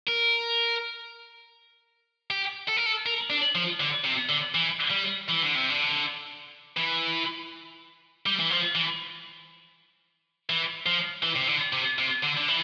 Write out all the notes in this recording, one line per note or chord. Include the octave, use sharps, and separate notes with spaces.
A#4
G4
A4
A#4
A4
A#4
D4
F3
D3
C3
D3
E3
G3
E3
D3
C3
D3
E3
G3
E3
F3
E3
E3
F3
E3
C3
D3
C3
C3
D3
D3
E3